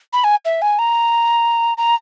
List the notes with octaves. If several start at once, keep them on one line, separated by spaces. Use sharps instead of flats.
B5
G#5
E5
G#5
A#5
A#5